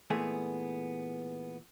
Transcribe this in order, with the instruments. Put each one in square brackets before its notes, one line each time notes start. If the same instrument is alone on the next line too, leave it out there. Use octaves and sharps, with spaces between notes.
[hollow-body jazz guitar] A#2 E3 A3 B3 G#4